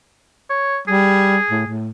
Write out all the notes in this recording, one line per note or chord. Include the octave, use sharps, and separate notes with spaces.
C#5
G3 G#4
A2
A2